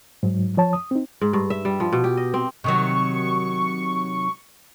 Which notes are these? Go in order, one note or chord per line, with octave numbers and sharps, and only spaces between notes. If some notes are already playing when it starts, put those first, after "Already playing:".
G#2 F#3
F3 C#5 A5
D#6
C4 D#4
G#2
G2
E5
G3
F3
B2
G4
D#5
C4
C3 D#3 F#3 C#6